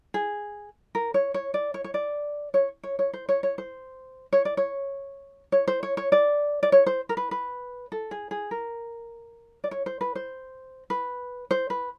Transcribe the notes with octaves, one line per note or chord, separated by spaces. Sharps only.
G#4
A#4
C#5
C#5
D5
C#5
C#5
D5
C#5
C#5
C#5
C5
C#5
C#5
C5
C#5
D5
C#5
C#5
C5
C#5
C#5
D5
D5
C#5
C5
A#4
B4
B4
A4
G#4
G#4
A#4
D5
C#5
C5
B4
C5
B4
C5
B4